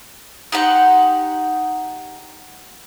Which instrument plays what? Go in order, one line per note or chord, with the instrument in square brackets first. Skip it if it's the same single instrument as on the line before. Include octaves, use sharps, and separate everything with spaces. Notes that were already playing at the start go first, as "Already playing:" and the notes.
[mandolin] D#4 G4 F#5 C6